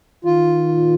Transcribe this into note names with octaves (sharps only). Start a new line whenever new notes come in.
D#3 F4
A#2